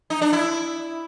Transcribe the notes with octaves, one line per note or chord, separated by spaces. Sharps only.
D#4
D4
E4